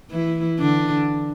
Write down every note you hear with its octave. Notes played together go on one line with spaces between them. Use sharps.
E3 E4
D3 D4